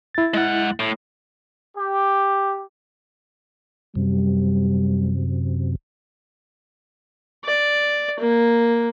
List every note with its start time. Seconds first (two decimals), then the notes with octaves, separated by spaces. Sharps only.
0.15 E4 A6
0.34 G#3 F#5
0.80 A2
1.77 G4
3.95 F#2 C3 G3
7.45 D5
8.20 A#3